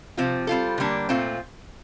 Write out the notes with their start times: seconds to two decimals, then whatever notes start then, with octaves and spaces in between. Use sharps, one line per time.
0.17 C3 F3 C4 F4
0.47 G3 C4 F4 A4
0.78 D3 G3 A#3 D4
1.09 A#2 A3 C4 F4